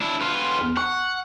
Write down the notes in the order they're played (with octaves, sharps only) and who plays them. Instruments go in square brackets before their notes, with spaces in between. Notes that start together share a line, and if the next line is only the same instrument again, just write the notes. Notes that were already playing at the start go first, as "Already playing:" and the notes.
[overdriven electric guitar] D4 E4
B3 F4
[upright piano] E2 F6
[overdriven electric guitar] F#5 [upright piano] C#6